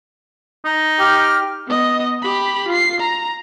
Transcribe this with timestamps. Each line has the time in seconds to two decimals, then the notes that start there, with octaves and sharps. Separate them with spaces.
0.65 D#4
1.00 G4 F6
1.68 B3 D#5
2.22 G4 B5
2.68 F4 C7
3.00 A#5